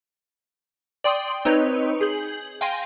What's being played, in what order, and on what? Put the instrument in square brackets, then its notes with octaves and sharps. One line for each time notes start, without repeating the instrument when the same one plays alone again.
[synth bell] D5 G5 C6 D#6
C4 D#4 B4 C#5 D#5
G#4 G6 F#7
F5 G5 G#5 C6 A#6 D#7